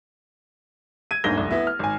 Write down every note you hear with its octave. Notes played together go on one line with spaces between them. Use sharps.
G#6 D#7
G1 D2 G#2 A#3 A#6 G7
F1 C2
B3 E4
F6
G#1 G#5